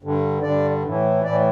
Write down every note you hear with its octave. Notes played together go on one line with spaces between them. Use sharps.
G2 D3
G2 D3 D5
A2 E3
A2 E3 D5